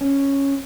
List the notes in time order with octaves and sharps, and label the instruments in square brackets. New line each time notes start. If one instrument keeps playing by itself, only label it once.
[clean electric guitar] C#4